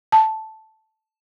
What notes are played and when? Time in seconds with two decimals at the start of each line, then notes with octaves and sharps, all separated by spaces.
0.12 A5